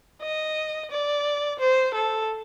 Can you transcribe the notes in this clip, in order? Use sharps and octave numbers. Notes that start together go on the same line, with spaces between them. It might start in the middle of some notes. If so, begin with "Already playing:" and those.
D#5
D5
C5
A4